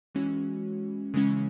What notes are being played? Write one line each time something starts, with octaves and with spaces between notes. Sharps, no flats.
E3 G#3 C#4 F#4
C#3 E3 G#3 C#4